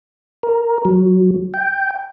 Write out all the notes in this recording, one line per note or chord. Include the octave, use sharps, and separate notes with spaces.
A#4
F#3
G5